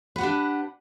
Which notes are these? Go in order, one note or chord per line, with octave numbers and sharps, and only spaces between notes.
D4 G4 B4 F#5